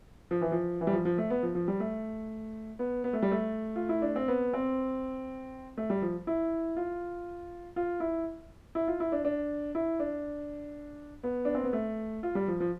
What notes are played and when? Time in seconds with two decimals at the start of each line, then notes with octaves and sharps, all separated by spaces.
0.31 F3
0.41 E3
0.52 F3
0.81 E3
0.87 G3
0.93 F3
1.05 F3
1.18 A3
1.30 B3
1.43 F3
1.55 F3
1.68 G3
1.80 A3
2.79 B3
3.04 B3
3.13 A3
3.23 G3
3.32 A3
3.76 F4
3.89 E4
4.02 D4
4.16 C4
4.28 B3
4.53 C4
5.78 A3
5.90 G3
6.02 F3
6.27 E4
6.76 F4
7.76 F4
8.00 E4
8.75 E4
8.88 F4
9.00 E4
9.12 D4
9.25 D4
9.75 E4
10.00 D4
11.23 B3
11.45 D4
11.55 C4
11.64 B3
11.73 A3
12.23 F4
12.35 G3
12.48 F3
12.60 F3